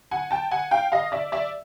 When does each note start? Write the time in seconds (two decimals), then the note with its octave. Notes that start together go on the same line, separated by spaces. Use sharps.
0.11 F#5 G#5
0.31 G5 A5
0.51 F#5 G#5
0.71 F5 G5
0.92 D#5 F5
1.12 D5 E5
1.32 D5 E5